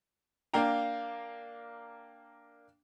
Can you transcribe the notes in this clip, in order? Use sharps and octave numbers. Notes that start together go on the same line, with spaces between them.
A#3 D4 F5 G5 A#5